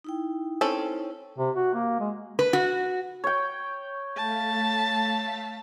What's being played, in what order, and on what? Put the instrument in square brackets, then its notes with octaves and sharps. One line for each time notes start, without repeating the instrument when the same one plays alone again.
[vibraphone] D#4 E4 G5
[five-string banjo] C4 C#4 A4
[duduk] C3
F#4
A#3
G#3
[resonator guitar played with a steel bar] B4
F#4
[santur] C#5 G5
[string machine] A3 F5 B6 [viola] A5